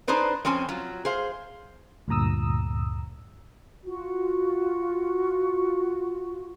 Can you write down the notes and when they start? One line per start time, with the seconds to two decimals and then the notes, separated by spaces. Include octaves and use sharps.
0.08 D4 D#4 G#4 B4 C5 D5
0.45 F2 C4 C#4 C5 G#5
0.69 F#3 F4
1.05 G#4 C5 F5
2.08 D2 G2 A#2 A#5 D#6 E6
3.85 F4 F#4